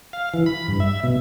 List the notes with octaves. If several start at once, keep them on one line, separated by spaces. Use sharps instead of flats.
F5
E3
B5
G2
E5
B2